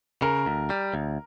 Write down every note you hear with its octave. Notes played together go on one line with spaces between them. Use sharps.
C#3 A#4
D2
G3
D2